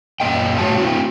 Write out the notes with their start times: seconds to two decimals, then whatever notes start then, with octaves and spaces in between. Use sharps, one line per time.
0.20 F#2 A#2 D#5 G5
0.58 A2 F#4 C#5 A5
0.78 C4 E4 F#4